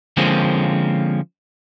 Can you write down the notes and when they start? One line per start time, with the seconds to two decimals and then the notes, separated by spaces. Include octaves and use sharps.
0.17 D3 F3 G#3 A#3 C4 C#4